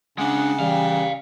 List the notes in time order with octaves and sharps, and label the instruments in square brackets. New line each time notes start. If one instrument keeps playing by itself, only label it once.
[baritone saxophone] C#3 [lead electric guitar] G#3 D4 [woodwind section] F#5
[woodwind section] E3 [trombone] G3 [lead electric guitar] D5 F5